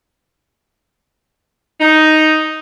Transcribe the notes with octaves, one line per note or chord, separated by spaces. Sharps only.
D#4